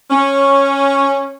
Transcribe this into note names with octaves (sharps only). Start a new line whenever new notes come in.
C#4